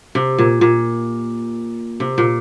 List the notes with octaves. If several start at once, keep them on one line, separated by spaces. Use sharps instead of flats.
C3
A#2
A#2
C3
A#2